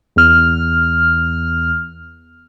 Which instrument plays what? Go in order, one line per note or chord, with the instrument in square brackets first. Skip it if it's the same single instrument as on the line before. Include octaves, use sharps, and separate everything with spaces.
[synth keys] E2 F6